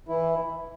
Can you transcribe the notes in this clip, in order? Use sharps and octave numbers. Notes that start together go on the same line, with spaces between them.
E3 E4